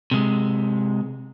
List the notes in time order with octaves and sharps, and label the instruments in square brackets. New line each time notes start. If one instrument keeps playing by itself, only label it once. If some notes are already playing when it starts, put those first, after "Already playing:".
[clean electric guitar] C3 G#3